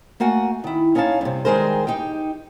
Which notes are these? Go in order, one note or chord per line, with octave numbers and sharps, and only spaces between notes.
A3 A#3 F#4 F#5 G#5
D#3 E4
C#4 D#4 C#5 F5 A5
G2 C3
D#3 G3 G#3 G#4 A#4 C5
D#4 G4 G5